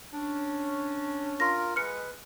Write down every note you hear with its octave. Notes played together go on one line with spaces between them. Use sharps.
C#4 D4
F4 A#4 C6 A#6
G#3 B4 G#5 F6 C#7